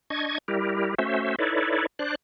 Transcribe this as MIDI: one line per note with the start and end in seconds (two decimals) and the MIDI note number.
0.10 0.38 62
0.10 0.38 75
0.10 0.38 85
0.10 0.38 92
0.48 0.95 55
0.48 0.95 64
0.48 0.95 67
0.48 0.95 70
0.98 1.36 57
0.98 1.36 61
0.98 1.36 66
0.98 1.36 72
0.98 1.36 76
1.39 1.86 63
1.39 1.86 64
1.39 1.86 69
1.39 1.86 71
1.39 1.86 73
1.39 1.86 74
1.99 2.15 62
1.99 2.15 72
1.99 2.15 74
1.99 2.15 90